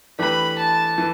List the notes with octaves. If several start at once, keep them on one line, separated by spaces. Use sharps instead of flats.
E3 A3 D4 G4 B4 B5
A5
E3